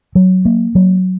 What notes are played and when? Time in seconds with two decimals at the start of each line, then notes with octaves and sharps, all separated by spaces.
0.15 F#3
0.45 A#3
0.75 F#3